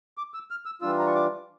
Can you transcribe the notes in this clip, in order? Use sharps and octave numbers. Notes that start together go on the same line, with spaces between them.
D6
E6
F6
E6
E3 G3 D4 F4 E6
A#5
C#6
D6